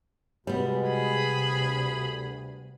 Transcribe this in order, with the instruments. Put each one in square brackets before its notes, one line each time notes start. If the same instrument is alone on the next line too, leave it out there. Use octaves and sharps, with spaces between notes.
[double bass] C3 [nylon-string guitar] G3 B3 [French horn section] G#3 F#4
[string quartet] G#4 B5
[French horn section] D2